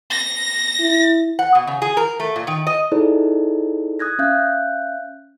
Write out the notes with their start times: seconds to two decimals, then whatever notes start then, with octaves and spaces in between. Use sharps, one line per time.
0.11 A#6
0.80 E4
1.39 F#5
1.55 B2
1.67 C#3
1.82 G#4
1.97 A#4
2.20 A3
2.36 A#2
2.47 D#3
2.67 D#5
2.92 D#4 E4 G#4 A4 C5 D5
3.99 D#6 F#6 G#6 A#6
4.19 C#4 E5 F5 F#6 G6